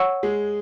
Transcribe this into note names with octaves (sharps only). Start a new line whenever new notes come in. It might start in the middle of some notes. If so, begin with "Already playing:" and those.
Already playing: C#5 F#5 C#6 E6
G#3 G#4